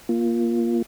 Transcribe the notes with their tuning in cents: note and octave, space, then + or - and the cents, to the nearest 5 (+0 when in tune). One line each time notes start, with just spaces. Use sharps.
A#3 +20 F4 -5